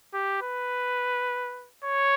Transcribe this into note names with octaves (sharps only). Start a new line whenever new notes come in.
G4
B4
C#5